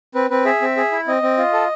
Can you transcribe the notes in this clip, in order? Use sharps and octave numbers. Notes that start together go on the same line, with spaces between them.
C4 B4
C4 B4
G#4 E5
C4
G#4
E4
C4 D#5
C4
F4
A4